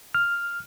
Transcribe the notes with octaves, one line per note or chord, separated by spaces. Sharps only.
F6